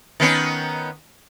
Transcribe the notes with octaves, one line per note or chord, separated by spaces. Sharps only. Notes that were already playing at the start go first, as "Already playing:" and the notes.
D#3 B3 C#4